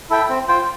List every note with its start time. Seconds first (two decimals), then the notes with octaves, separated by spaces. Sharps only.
0.10 E4 A4 E5 G5
0.29 C4
0.48 F4 C5 G5